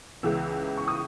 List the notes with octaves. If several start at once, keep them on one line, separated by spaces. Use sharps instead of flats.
C#2 C#3 E3 B3 E6
C#6
D#6